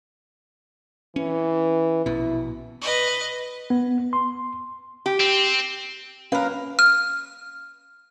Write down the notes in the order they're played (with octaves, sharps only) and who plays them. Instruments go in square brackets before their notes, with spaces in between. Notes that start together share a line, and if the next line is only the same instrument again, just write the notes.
[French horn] E3 [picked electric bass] C#4
[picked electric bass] A#1 B2 [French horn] E4
[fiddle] B4 D#5
[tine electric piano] B3
C6
[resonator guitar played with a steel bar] G4
[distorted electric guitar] C4
[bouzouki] A#3 A#4 [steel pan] C#4 B4
[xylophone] F6